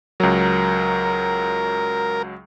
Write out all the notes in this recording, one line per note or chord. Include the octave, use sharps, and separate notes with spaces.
C#2 F#3 A#4